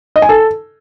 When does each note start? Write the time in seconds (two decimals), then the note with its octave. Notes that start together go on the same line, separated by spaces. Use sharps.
0.16 D#5
0.22 G#5
0.29 A4